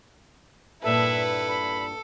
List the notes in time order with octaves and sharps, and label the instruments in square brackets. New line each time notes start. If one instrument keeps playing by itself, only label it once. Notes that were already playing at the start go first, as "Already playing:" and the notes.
[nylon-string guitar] G2 A#2 A5 [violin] E4 B4 [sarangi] A4 [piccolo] E5
[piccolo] B5